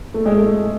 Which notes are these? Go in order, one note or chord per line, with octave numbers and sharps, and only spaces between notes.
A3
G#3
A3